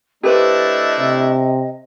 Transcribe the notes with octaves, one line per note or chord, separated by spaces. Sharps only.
A3 D4 E4 G4 B4 C5 D#5
C3